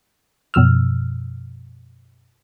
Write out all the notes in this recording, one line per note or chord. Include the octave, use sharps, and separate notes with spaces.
F#2 B2 F3 E6 F6